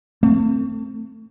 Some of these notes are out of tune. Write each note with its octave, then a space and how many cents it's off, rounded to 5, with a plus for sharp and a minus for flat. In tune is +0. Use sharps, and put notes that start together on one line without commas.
A3 +35 C4 +5